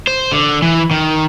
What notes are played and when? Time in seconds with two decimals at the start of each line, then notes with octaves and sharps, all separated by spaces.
0.07 C5
0.32 D3
0.62 E3
0.91 D#3